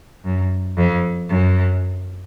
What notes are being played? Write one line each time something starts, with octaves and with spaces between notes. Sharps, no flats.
F#2
F2
F#2